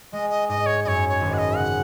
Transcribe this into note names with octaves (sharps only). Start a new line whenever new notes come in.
G#3 D#5
D#5
G#2 D#5
C#5
F#2 C#5 D#5
C#5
G#1
F#5
D#5
C#3 F#5